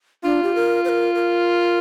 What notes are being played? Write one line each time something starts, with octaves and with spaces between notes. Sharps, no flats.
D4 F4
G4
A#4
C5
A#4
A#4